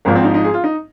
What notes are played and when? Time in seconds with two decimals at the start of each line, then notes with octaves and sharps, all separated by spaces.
0.05 G#1 G#2 F3 A#3
0.15 C4
0.24 D#4
0.34 D#4
0.44 G#4
0.54 F4
0.64 D#4